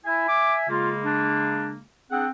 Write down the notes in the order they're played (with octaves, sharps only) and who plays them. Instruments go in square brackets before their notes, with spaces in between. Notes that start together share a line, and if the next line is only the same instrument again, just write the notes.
[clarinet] E4 [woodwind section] E5 G#5
[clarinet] D6
[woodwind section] C#3 G#3 A#3 [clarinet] F4
[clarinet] D4
[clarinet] C4 [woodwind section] D4 G#4 F#5